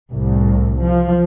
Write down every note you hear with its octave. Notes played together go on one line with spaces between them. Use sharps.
C2 A2
F3